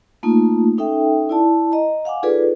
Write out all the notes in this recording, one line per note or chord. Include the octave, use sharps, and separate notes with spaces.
A3 A#3 D#4 F4
C#4 D#4 A4 E5 G5
E4 D5 A5
D#5 A#5
F5 F#5 G#5 D6
D#4 F4 G#4 A4 B4 D5